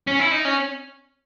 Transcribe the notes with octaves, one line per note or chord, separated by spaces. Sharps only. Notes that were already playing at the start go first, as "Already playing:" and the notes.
C#4
E4
D#4
C#4